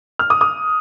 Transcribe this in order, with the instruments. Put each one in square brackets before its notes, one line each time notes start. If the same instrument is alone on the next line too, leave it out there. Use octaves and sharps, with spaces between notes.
[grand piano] F6
D#6
D#6